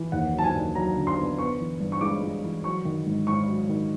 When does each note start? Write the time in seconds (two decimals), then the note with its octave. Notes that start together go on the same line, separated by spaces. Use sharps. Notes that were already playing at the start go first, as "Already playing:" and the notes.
Already playing: E3
0.12 D#2 F#5
0.33 F#3
0.38 A5
0.44 G#5
0.54 D#2
0.75 F#3 A#5
0.96 D3
1.07 C6
1.17 B3
1.38 B3 C#6
1.59 E3
1.80 G2
1.92 C#6
2.01 G#3 D6
2.22 G#3
2.43 E3
2.64 F#3 C#6
2.85 D#3
3.06 G#2
3.27 G#2 C#6
3.48 F#3
3.69 D#3